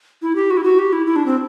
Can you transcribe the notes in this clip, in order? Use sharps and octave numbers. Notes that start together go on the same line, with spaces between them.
E4
G4
F#4
E4
F#4
G4
E4
E4
D4
C4